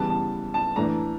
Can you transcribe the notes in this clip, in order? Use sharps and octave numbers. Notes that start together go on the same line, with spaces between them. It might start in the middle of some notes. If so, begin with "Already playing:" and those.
Already playing: C#3 E3 G3 B3 A5
A5
A5
A2 E3 A3 D4 A#5